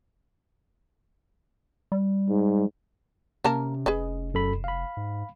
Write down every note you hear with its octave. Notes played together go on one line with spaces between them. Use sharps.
G3
G#2
C3 A#3 C#4 A#4 A5
F1 G#4 B4 D#5
F#2 A4 B5
F5 B5
G#2